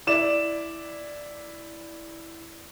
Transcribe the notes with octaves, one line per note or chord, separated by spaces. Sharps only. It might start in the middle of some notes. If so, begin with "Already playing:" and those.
E4 D5 E7